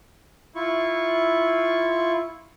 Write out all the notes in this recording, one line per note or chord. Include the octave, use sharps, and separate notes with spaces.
E4 F4 C#6